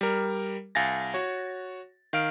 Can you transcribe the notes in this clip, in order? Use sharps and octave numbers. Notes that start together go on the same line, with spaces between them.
G3 A#4
C2 F5 G#5 A6 A#6
F#4 C#5
D#3 F5 F6 D7